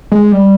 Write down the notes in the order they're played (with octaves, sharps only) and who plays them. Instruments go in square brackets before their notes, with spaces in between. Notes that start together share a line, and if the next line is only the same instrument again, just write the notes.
[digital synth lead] G#3
G3